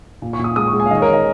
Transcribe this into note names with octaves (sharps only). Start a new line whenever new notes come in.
A#2
C#6
A#2
D#6
G#3 D#6
C#6
G#3
G#5
F5
D#3 D#5
C#5
A#4
D#3
D#5